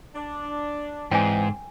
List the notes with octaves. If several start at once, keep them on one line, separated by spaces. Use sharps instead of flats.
D4
G#2 E3 C4 D5 G5 G#5